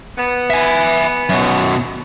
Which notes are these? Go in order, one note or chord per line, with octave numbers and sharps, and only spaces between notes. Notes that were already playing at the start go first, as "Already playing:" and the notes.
B3
E5 G#5
F#2 B2